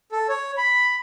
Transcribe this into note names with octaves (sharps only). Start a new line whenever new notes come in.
A4
C#5
B5